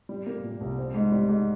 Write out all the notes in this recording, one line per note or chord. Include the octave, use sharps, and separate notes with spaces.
G3
A#3
A#2
C2
C4
G#2
G3
G#2